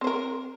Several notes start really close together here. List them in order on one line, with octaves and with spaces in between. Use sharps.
C4 C5 A#4